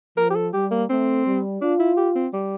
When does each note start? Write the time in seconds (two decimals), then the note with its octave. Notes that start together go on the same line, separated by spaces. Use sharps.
0.17 F3 A#4
0.30 G4
0.35 A4
0.53 G3 G4
0.71 A#3
0.89 A3 C4
1.26 G3
1.61 D4 F4
1.79 E4
1.97 G4
2.15 C4
2.33 G3